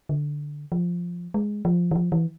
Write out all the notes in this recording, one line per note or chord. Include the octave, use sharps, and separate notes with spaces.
D3
F3
G#3
F3
E3
F3
E3